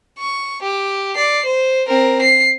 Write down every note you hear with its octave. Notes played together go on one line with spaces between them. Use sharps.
C#6
G4
D5 C7
C5
C4 A#4
C7